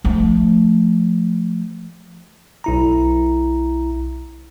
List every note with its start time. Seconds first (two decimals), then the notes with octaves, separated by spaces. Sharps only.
0.04 F3 A3
2.64 B1 E4 A#5